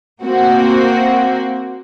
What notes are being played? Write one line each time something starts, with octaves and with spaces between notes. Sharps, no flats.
A#3 C4 F#4